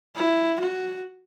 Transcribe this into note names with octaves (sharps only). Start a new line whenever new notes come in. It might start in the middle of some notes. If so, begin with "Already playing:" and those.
E4
F#4